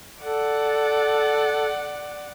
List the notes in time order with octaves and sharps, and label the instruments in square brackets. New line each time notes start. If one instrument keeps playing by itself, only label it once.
[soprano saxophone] A4 [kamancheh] D5 F#5